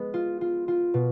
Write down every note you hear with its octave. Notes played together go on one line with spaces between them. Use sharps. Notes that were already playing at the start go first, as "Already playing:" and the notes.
Already playing: G#3 B3
F4
F4
F4
B2